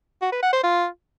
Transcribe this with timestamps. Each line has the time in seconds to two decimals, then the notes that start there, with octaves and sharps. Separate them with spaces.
0.22 F#4
0.32 B4
0.43 F#5
0.53 C5
0.63 F4